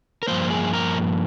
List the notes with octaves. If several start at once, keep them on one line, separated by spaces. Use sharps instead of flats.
A#4
G2 F3 A#3 C5
G#4
A#4